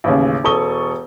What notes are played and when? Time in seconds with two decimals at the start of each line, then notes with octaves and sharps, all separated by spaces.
0.04 A1 D#2 C#3
0.44 E1 A4 C#6 D#6 G7